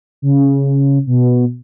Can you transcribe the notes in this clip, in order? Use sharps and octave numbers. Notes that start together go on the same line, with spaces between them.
C#3
B2